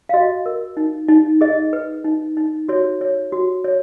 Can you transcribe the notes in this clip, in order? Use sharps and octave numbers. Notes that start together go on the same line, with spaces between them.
F5
F#4 D#5
A#4
D#4
D#4
G#4 D#5
B4
D#4
D#4
F#4 C#5
C#5
F#4
C#5